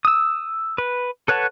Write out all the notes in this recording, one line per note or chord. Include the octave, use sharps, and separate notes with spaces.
D#6 E6
B4
A4 B4 C#5 F#5 A5